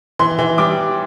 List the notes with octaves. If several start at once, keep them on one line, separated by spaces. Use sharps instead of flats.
E3 C6
E3
G3 D6